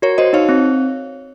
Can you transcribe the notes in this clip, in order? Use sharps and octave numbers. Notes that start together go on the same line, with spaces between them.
F#4 A#4 C#5
F#4 C5 D#5
D#4 C#5 F5
C4